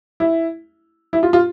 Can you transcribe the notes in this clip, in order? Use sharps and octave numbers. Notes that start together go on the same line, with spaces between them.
E4
E4
F4
F4